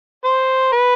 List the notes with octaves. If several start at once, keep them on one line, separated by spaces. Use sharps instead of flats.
C5
B4